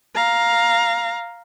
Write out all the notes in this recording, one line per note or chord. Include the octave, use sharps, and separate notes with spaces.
F5 A#5